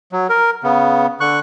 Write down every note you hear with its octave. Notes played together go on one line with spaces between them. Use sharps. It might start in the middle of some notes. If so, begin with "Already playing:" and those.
F#3
A#4
C#3 B3
D3 C#6 F#6